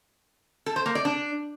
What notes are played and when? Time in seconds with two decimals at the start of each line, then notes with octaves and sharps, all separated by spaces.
0.66 A4
0.76 C5
0.86 A#3
0.95 D5
1.05 D4